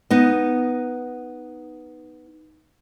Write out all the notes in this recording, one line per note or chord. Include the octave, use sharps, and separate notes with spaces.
B3 D#4 D#5